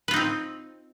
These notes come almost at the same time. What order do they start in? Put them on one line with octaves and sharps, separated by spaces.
B4 F4 D#4 C4